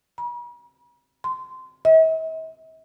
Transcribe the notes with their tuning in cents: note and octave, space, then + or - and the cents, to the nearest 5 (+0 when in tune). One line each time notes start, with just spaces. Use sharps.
B5 -45
C6 -20
E5 -45